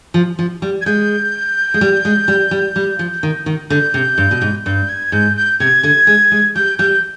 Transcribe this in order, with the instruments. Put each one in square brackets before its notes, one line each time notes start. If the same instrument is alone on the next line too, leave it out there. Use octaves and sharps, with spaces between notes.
[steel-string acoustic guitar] F3
F3
G3
[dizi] G#6
[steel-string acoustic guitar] G#3 [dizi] G6
[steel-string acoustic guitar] G#3
G3
G#3
G3
G3
G3
F3
D#3
D#3
[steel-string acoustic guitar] D3 [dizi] G6
[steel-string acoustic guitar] C3
G2
B2
G#2
[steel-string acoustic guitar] G2 [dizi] G6
[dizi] G#6
[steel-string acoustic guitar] G#2 [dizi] G6
[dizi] G6
[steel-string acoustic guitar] C3 [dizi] G#6
[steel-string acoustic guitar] D3
G#3
G#3
[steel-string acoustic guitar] G3 [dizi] G6
[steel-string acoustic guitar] G3 [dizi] G6